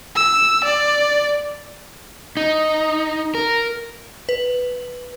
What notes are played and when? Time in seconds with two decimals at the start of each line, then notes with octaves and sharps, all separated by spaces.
0.15 E6
0.64 D5
2.37 D#4
3.35 A#4
4.29 B4